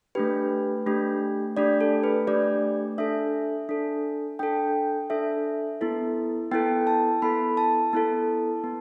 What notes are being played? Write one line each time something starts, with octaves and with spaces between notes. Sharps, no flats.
A3 D4 G4 B4
A3 D4 G4
A3 D4 G4 D5
A4
B4
A3 D4 G4 D5
D4 A4 E5
D4 A4
D4 A4 G5
D4 A4 E5
B3 E4 A4
B3 E4 A4 G5
A5
B3 E4 A4 B5
A5
B3 E4 A4
B3